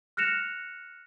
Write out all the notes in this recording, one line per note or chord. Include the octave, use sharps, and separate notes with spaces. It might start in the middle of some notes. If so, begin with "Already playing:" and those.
F6 F#6 A#6 C#7 E7 F7